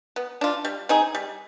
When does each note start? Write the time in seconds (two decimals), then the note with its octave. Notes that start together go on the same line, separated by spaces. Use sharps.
0.16 B3
0.41 D4 F4
0.65 G3
0.89 C4 D#4 G#4
1.15 G3